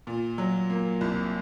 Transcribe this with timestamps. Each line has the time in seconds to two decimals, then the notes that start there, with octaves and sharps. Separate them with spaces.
0.07 A#2
0.38 F#3
0.70 A#3
1.01 C2